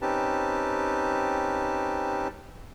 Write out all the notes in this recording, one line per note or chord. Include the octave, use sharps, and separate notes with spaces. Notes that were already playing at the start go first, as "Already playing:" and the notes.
C4 C#4 D#4 G4 B4 A5